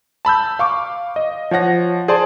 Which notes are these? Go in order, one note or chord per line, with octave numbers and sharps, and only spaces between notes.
A5 B5 E6 G6
F5 C#6 D6
D#5
F3 C#5 F#5 A#6
G#4 C5 D5 A5 C6